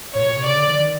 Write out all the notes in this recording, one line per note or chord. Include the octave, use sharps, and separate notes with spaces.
A2 C#5
B2
A#2
C3
C#3 D5
D3
D#3
D#3